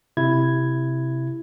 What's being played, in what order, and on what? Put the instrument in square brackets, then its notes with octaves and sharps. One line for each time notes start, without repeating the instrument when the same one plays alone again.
[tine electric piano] C3 E4 G#6